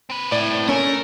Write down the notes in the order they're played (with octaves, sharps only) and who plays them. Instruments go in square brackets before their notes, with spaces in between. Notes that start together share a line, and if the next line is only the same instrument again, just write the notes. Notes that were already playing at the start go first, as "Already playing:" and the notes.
[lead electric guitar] C4 B4
[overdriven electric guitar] A2 [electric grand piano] D5
[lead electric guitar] A3 [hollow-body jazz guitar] C#4 [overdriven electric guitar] A#4